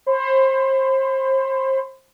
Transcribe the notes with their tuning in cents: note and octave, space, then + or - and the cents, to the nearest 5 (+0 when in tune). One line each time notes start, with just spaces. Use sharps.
C5 +30 B5 +45